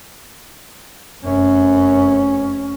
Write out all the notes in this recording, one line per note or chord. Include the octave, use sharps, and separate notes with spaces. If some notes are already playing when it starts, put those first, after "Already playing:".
F1 F#2 C#4